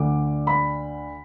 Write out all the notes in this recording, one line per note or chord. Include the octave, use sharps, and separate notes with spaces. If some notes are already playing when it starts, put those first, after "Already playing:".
Already playing: D2 D3 D6
B5